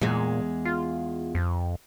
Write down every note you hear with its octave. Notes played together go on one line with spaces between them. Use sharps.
E2 A#2 G#3
F4
F2